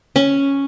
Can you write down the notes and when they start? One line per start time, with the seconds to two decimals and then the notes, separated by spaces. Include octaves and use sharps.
0.16 C#4